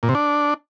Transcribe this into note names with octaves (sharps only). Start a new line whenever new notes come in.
A#2
C3
D4